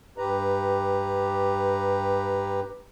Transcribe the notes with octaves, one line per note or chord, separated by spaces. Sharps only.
G2 G4 B4 A#5